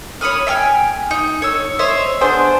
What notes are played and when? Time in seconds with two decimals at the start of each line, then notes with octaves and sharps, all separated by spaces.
0.21 C#5 B5 D#6 F6
0.47 E5 G5 G#5 F6
1.11 D#4
1.42 C#5 E6
1.79 C5 C#5 D#5 E5
2.21 B3 D4 G#4 C5